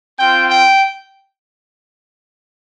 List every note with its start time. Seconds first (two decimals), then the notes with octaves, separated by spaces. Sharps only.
0.19 C4 F4 G5
0.50 G5